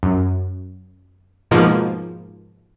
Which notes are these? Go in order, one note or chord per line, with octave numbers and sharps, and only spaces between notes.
F#2
G#2 B2 F3 A#3